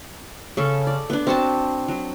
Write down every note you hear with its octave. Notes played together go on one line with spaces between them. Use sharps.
C#3 C#4 A4
D5
B3 D4
C4 F#4 A5
F#3